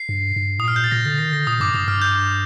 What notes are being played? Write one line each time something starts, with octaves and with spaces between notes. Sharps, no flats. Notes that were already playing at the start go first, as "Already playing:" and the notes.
Already playing: C7
G2
G2
A2 D#6
A#2 F6
G6
A6
A#2 A#6
D3 A6
D#3 A#6
D3 A#6
A#2 D#6
G2 D6
G2 D#6
G2 F6
G6